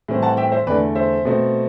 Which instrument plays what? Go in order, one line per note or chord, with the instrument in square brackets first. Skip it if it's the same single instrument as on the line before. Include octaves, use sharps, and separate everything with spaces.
[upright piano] A2 E3 G3 C4
F#5 A5
E5 G5
C5 E5
E2 D3 A3 B4 D5
C5 E5
B2 A3 C4